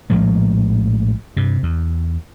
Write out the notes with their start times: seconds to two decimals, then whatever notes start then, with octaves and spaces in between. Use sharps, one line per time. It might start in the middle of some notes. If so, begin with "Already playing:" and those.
0.10 A#1 A2 F3 G#3
1.37 G2 C3
1.63 E2